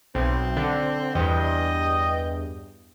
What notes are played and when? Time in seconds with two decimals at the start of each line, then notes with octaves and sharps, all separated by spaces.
0.15 B1 C4
0.57 D3
1.15 E2 G2 D#5 G5